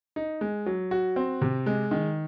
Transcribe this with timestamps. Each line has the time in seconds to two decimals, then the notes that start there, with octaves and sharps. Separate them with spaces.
0.16 D#4
0.41 G#3
0.66 F#3
0.91 F#4
1.16 C4
1.42 C3
1.66 G#3
1.91 D#3